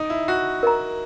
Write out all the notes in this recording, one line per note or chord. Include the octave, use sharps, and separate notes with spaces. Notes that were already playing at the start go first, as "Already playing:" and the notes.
Already playing: D#4
E4
F#4
A#4 D#5 A#5